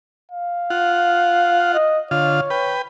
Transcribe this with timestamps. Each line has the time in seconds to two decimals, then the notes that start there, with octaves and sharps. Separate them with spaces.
0.31 F5
0.70 F4 F#5
1.74 D#5
2.11 D3 F4 C#5 F5
2.50 B4 G5